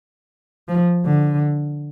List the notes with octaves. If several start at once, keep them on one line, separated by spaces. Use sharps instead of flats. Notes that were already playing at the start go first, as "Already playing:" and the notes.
F3
D3